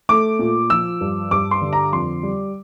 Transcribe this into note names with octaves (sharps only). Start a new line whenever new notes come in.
A3 D6
A#2
F3 E6
G2
G2 D6
C6
D3
A#5
F2 C6
G3